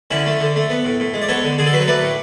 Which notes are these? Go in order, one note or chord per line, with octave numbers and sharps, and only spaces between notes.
D3 C#4 E4
A3
D3
A3
B3
A2
A2
G#3
D5
B3 A4 C#5
D3
D3 G#4
A4
F#3 B4
C#5
A3 B4 D5
A2